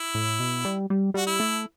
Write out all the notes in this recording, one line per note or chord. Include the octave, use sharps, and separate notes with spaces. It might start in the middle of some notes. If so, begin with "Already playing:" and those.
Already playing: E4
A2
B2
G3
G3
G3 F#4
E4
A3